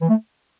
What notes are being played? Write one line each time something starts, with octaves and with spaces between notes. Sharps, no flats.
E3
A3